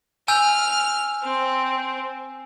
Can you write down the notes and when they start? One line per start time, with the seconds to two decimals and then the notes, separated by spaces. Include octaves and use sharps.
0.28 G#5 E6 F6 G6
1.23 C4